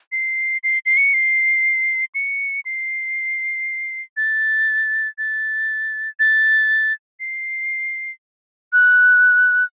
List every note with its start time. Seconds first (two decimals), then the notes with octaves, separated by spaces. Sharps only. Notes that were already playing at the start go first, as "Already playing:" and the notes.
0.12 C7
0.64 C7
0.86 C7
0.97 C#7
1.14 C7
2.15 C#7
2.65 C7
4.17 A6
5.18 A6
6.20 A6
7.20 C7
8.73 F#6